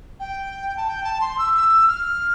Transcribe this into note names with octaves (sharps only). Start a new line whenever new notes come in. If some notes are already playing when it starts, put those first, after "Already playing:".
G5
A5
G5
A5
C6
E6
E6
F6